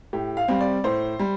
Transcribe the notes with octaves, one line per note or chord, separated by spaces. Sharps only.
A2 G4
F5
G3 C4
D5
A2 C5
G3